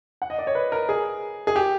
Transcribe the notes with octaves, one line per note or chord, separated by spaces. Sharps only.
F#5
D#5
D5
C#5
B4
A#4
G#4
G#4
G4